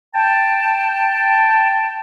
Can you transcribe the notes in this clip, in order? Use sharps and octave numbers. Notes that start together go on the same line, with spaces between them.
G5 A5